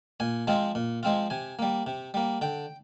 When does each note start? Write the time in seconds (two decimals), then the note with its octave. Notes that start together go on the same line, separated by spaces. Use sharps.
0.20 A#2 G#5
0.47 F3 G#3 C4 F4
0.75 A#2
1.03 F3 G#3 C4 F4
1.30 C3 G#5
1.59 G3 A#3
1.86 C3
2.14 G3 A#3
2.41 D3 G5